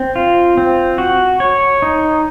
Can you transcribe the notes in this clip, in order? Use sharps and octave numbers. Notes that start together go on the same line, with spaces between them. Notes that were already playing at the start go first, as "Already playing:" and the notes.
Already playing: C4
F4
C4
F#4
C#5
D#4